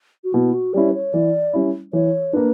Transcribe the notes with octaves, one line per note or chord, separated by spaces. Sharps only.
F#4
B2 E4
F#4
G3 C#4 E4 D5
B4
C#5
E3 D5
G3 C#4 E4
E3 C#5
A#3 D4 B4